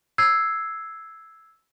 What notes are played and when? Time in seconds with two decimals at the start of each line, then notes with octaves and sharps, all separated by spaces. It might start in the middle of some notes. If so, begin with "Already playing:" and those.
0.18 E6 G#6 C7